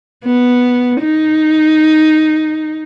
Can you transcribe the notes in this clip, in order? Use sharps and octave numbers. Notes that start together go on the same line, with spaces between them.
B3
D#4